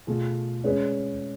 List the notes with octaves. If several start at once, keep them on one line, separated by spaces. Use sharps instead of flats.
B2 A3 F4 G#4
G#3 C#4 G#4 B4